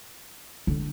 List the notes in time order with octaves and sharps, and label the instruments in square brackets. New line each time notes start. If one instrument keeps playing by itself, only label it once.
[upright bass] D3